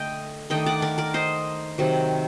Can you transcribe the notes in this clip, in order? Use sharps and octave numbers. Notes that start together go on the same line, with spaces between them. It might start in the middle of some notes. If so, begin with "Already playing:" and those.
Already playing: D3 A3 D#5 G5
D#3 A3 D4 D#5 G5
D5 F#5
A#4 D5
A#4 D5
C5 D#5
C3 D#3 F#3